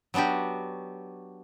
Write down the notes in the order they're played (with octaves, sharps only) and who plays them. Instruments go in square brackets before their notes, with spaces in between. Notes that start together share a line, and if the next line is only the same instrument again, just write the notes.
[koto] F#3 B3 D4 F#4 G4